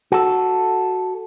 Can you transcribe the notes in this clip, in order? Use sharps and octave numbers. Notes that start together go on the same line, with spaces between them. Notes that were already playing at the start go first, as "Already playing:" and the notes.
F#4 A4